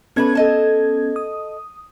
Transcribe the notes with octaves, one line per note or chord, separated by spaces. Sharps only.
A3 B3 C#4 D4 B4 G#6
A4 D#5 A5
D#6